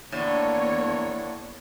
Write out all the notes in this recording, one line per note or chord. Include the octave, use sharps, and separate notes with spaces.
E2 A2 D3 A#3 C#5